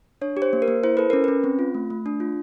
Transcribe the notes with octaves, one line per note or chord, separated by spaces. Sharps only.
D4 C#5
G4
C5
A#3
A#4
A#3
E4 C5
A4 B4
C#4 A#4
C#4 B4
C4
F4
A3
A3
D4
F4